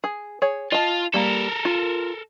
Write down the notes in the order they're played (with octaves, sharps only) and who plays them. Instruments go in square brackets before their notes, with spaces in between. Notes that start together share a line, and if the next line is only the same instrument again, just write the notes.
[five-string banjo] G#4
G#4 C#5
[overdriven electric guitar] F4 [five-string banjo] D#5 A5
[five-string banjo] G3 A#3 [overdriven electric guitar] A4 A#4
[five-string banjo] F4